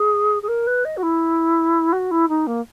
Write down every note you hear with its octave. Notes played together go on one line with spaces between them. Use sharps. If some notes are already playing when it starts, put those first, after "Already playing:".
Already playing: G#4
G#4
A#4
B4
D#5
F#4
E4
F#4
E4
D#4
A#3